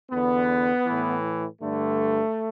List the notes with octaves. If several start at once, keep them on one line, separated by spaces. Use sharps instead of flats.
E2 D3 B3
A2 E3
G2 D3 A3